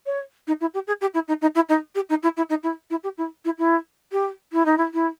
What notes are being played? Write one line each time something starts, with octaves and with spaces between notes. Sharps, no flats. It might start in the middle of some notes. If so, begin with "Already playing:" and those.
C#5
D#4
E4
G4
G#4
G4
E4
D#4
D#4
E4
D#4
G4
D#4
E4
E4
D#4
E4
E4
G4
E4
E4
E4
G4
E4
D#4
E4
E4